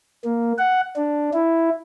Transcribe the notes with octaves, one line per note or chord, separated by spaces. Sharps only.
A#3
F#5
D4
E4